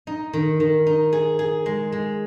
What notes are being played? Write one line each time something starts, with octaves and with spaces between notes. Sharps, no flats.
D#4
D#3
D#3
D#4
G#4
G#4
G#3
G#3